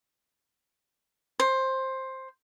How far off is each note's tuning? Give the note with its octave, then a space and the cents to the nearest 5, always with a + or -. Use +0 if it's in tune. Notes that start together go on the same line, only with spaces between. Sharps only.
C5 +10